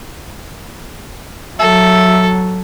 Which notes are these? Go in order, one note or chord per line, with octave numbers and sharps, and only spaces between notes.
F#3 A4 E5